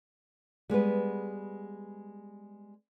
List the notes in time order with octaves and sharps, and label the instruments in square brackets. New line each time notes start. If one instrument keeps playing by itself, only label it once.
[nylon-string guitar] G3 G#3 B3 B4